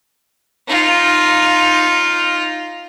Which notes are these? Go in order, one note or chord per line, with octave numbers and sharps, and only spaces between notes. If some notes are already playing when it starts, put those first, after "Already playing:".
D#4 F4